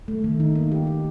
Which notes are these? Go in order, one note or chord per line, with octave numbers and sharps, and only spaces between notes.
A3
D#3
D#4
A#3
G4
D#4